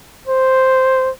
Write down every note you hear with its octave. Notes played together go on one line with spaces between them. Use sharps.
C5